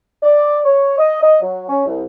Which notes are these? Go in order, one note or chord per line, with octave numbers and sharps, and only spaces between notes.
D5
C#5
D#5
D#5
F#3
C#4
C2